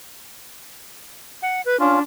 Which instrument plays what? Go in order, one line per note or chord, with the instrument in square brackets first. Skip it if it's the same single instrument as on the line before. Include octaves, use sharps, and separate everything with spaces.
[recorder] F#5
B4
[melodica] C#4 F4 [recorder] D4